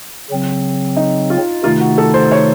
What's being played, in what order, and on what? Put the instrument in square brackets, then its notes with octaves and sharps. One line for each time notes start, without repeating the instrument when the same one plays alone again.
[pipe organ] C#3 F#3 C4
[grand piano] D#4
F4
[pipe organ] C3 D#3 A3 D#4 [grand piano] F4
[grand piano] F#4
A4
C5
C#5